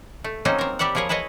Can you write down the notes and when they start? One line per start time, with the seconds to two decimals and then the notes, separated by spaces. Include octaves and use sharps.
0.24 A3
0.45 F#3 A#3 C4 C#4 D#4 D#5
0.58 C4 A#4
0.79 G3 G4 D5 E5 F#5
0.95 F3 E4 G#4 A#4 C#5
1.09 E4 G#4 B4 C#5 D#5